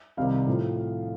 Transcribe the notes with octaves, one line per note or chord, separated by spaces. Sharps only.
C2 C3 D#3 G3 F5
A2 F3